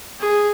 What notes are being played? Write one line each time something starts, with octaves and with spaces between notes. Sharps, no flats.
G#4